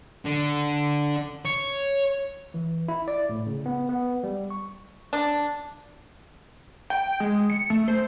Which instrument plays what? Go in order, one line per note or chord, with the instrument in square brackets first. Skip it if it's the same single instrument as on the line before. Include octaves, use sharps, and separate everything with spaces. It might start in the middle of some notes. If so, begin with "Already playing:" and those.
[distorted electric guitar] D3
C#5
[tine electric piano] E3
E4
D5
A2
C#3
B3
B3
G3
C#6
[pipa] D4
[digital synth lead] G5
G#3
C#7
A3
C5